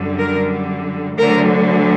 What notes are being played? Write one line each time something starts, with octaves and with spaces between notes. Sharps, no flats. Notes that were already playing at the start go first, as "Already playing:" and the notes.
Already playing: F#2 D3 G3
A#4
D2 D3 F#3 A#4